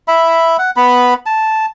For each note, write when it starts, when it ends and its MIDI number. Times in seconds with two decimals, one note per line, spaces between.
0.08 0.57 76
0.08 0.57 83
0.59 0.71 78
0.77 1.14 59
0.77 1.14 83
1.26 1.66 81